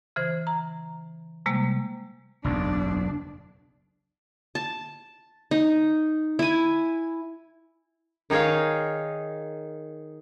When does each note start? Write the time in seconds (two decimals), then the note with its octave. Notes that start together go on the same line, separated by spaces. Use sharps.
0.16 C#3 E3 C5
0.47 A#5
1.46 C3 G3 G#3 A#3
2.44 F#1 B1 E2 D4
4.55 A5
5.51 D#4
6.39 E4 G#5
8.30 D#3 D#4 G#4 C#5 F5